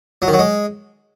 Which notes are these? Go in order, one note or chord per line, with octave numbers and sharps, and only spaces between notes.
F#3
D#3
F#3
G#3